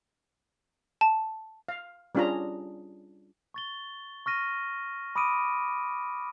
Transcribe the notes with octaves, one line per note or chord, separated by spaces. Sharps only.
A5
F5
G3 C#4 D4 F4 G#4 A#5
C#6 A6 G7
C#6 F6 A#6 D#7
B5 D6 D#6 D7 D#7